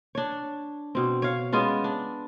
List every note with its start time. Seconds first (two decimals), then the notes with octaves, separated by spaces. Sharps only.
0.15 D4 C#5
0.95 B2 C4
1.22 C#5 F5
1.52 G#3 B3 C#4 F4
1.84 D4